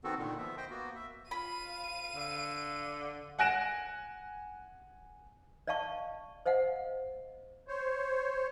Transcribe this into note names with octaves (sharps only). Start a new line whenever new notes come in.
D#3 B3 C4 F#4 A4
A#2 D3 D#3
F3 B3 E5
C5 D#5 G5
A#3 B3 F#4
E5
F4 F5 B5 D#7
D3
F#5 G#5 F#6 A#6 D7 E7
D5 D#5 F5 A5 C#6
C5 D#5 F5 F#5
C5 C#5